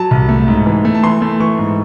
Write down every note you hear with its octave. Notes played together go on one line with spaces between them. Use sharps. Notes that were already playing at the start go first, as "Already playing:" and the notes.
Already playing: F#3 A5
C2
A3
G#2
E3
A3
A5
E3 C6
A3
E3 C#6
G#2